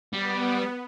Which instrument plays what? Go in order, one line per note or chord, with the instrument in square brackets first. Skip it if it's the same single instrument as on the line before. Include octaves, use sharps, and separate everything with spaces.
[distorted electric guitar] G3 [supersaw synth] B3